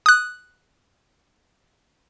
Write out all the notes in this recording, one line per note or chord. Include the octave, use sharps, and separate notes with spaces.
D#6 F#6